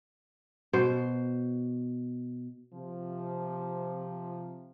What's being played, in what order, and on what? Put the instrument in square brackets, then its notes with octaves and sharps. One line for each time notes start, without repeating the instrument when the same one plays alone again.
[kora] B2 C5
[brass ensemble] C3 F3